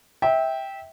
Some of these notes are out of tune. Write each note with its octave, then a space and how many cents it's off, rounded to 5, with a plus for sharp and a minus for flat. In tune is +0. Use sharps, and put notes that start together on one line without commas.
E5 -20 G5 +0